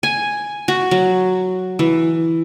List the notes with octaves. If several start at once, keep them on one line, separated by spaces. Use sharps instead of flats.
G#5
F#4
F#3
E3